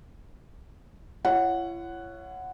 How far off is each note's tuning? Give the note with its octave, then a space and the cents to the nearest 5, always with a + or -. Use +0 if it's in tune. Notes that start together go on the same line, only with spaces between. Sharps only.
E4 +45 C#5 +0 F#5 +0